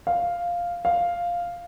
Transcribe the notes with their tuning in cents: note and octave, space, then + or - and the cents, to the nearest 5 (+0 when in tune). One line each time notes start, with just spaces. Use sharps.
F5 +0
F5 +0